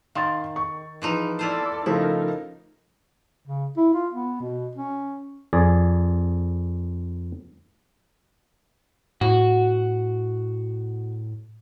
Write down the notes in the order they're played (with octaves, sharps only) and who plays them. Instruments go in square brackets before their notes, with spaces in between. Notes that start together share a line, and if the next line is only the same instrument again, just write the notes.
[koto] D#3 [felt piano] F5 C6 A6
[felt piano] C#6
[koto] E3 F3 D#4 [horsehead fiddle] G#4 B4
[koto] E4 F4 C5 [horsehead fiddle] A4 D5
[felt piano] C#3 F3 A3 [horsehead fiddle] D#4 A#4 [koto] E4
[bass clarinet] C#3
E4
F4
B3
B2
C#4
[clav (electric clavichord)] F2 G#4 D5
[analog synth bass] A2 [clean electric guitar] F#4